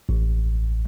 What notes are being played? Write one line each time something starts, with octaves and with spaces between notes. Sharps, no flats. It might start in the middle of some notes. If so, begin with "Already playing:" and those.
A1